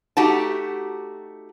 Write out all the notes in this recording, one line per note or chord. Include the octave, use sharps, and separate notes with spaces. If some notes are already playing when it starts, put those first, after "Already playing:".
A3 D#4 F#4 G4 A5